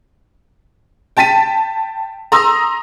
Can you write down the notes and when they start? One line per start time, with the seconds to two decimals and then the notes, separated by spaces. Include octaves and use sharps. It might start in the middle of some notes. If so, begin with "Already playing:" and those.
1.17 G5 A5 A6 B6 D#7
2.32 A#5 C6 D#6 E6 A#6